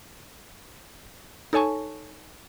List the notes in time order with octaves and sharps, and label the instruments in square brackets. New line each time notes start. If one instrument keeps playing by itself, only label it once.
[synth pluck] D#4 A4 C#5 G#5 A5 C#6